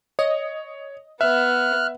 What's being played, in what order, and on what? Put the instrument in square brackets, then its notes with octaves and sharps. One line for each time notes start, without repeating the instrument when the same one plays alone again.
[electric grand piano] C#5 [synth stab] D#5
[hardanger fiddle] B3 [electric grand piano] E5 [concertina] F6 F#6